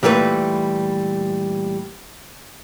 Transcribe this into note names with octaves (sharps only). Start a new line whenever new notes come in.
A#2 E3 G3 A3 B4